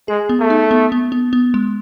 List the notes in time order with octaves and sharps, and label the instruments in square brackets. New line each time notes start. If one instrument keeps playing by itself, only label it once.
[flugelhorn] G#3 [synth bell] G#4
[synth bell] B3
[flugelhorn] A3
[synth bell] D#4
B3
B3
B3
B3
G#3